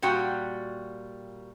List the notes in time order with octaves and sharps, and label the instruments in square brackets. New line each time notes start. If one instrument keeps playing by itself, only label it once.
[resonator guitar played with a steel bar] A#2 G3 F#4 G5